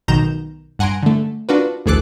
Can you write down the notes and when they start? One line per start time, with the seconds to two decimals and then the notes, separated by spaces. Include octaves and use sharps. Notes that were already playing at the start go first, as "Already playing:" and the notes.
0.08 B1 B2 D#3 A#5 G6 E7
0.79 G2 F#5 G#5 A#5 C6 D7
1.03 D3 A3
1.49 D4 F4 F#4 A#4 B4
1.86 A1 D2 G#4 A4 D6 F#6